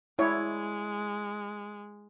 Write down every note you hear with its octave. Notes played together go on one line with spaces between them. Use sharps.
G#3 E4 C#5 D5